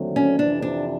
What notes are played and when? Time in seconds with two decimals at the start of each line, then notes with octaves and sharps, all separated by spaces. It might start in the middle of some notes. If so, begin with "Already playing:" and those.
Already playing: D#2 D3 F#3 A3 C4
0.16 C#4
0.39 F2 C3 E3 D4
0.62 D4